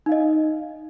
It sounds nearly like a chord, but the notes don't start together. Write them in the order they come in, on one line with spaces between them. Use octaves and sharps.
D#4 F5 D#5